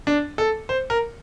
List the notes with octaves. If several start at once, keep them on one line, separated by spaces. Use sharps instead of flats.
D4
A4
C5
A#4